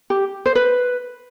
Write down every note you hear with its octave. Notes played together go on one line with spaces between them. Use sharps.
G4
C5
B4